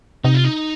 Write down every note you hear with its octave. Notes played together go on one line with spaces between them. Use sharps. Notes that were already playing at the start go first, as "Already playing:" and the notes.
C3 D#4
F4
D#4